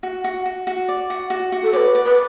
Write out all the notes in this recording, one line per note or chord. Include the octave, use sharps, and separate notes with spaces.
F#4
F#4
F#4
F#4
D5
F#4
F#4
F#4
A4
B4 C#5 D5
D5
B4